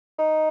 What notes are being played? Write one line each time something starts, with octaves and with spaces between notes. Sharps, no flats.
D#4